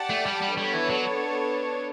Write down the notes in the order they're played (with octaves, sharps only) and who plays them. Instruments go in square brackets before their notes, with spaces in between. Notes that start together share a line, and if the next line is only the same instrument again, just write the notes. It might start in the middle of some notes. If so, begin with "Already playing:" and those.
Already playing: [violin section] G4 D5 F#5 A5
[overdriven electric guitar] A3
G3
G3
[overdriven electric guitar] G3 [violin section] B3 D4 A4 C#5
[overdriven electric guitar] E3
F#3